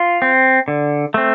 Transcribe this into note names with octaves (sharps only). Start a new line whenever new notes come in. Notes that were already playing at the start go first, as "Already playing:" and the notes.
Already playing: F4
C4
D3
A3 C4